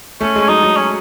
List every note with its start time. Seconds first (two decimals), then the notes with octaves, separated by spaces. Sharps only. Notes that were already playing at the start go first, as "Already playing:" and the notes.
0.21 A3 C#4
0.36 G#3
0.42 C#4
0.49 F#3 D#4
0.63 F#3
0.77 C#4